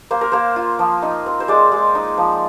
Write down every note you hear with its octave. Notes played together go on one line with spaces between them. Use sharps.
A#3 C5
A#4
A#3 C5
F4
F3
D#4
C4
C5
G#3 D5
G#3
D#4
F3